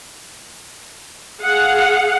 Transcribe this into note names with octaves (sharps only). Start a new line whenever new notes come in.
G#4 F5 F#5